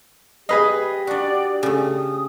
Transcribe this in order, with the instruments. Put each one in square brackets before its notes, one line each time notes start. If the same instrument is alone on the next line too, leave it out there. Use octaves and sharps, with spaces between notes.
[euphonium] G4 [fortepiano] G#4 B4 D#5 [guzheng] F5
[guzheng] D4 F#4 [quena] D5
[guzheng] C#3 A3 [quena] D#6